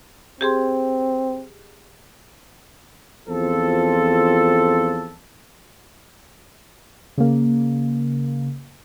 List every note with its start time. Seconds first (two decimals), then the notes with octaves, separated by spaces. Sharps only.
0.41 C4 G4 G#4 C6
3.28 E2 F3 C4 F4 A4
7.18 C#3 A#3